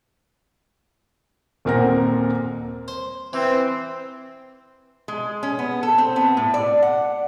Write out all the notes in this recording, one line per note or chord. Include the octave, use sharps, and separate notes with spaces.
D#1 A#2 C4 A#4 F#5 A#6
C5
E3 C4
G#3
C#4
B3
A4
C4
B3
A2
D5
F#5